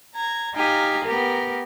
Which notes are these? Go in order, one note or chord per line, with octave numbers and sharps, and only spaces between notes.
A#5 G#6
D#4 G4 F5 G#5 A#5
B3 G4 A#4